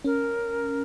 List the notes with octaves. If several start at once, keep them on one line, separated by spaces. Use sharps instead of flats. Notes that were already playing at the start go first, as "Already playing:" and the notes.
C#4 A#4